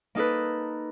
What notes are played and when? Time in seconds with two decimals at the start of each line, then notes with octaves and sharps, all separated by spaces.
0.15 A#3 D#4 A4 B4